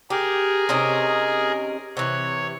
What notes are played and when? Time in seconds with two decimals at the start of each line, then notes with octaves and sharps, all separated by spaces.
0.10 G4 G#4 A#4
0.69 C3 C#4 D#4
1.97 C3 E3 C#5